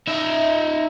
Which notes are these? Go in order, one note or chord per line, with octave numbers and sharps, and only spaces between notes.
D#4 E5